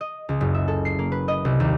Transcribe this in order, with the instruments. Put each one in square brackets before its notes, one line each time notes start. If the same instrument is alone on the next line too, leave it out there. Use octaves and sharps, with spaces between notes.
[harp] D#5
C#2
F#1
E5
A4
C7
A#3
B4
D#5
C2
D#2